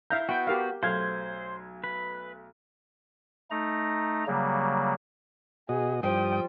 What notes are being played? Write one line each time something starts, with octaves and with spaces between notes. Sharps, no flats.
E4 E5 F5 A#5 G6
B3 F#4 G5
G4 A#4 F5
B1 A3 C5 F5 G#6
B4
A3 D#4 A#5
C#3 F#3 G3 A#3
B2 F#4 G#4 D#5
G2 F3 G3 G5 D#6